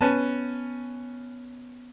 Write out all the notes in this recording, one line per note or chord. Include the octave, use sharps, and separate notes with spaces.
B3 C#4 B4 A5